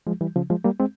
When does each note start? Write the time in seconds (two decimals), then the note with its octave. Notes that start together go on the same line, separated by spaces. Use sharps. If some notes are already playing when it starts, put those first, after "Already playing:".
0.07 F3 G#3
0.21 E3 G3
0.36 C#3 F3
0.50 F3 G#3
0.64 G3 A#3
0.80 G#3 C4